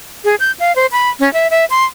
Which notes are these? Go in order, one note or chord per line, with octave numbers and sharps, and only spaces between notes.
G#4
G6
F5
C5
B5
C#4
E5
E5
C6